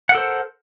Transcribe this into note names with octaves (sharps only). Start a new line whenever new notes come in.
A4 A#4 C5 F#5